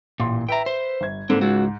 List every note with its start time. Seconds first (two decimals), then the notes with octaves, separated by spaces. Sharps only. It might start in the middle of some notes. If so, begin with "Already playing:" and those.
0.20 A1 A#2 C6
0.49 B4 E5 G5 A#5
0.66 C5
1.01 G1 G#6
1.30 G#2 D3 A#3 C4
1.41 C#2 F#4